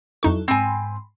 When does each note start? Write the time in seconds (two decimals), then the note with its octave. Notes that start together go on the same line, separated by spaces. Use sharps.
0.23 F2 F#3 D#4 E4 A4 C#6
0.48 G#2 C4 G#5 B5 C6